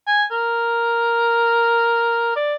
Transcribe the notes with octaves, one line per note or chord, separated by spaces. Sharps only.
G#5
A#4
D5